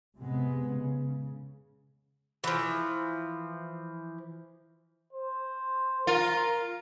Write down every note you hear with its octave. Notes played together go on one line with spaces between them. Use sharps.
C3 G#3 B3
C#3
E3 F3
C5
F4 A#4